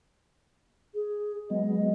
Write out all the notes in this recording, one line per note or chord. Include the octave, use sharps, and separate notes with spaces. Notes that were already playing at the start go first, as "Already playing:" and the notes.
G#4
F#3 G#3 B3 D#5